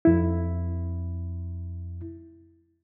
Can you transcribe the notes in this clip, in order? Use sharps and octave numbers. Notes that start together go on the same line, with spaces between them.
F2 E4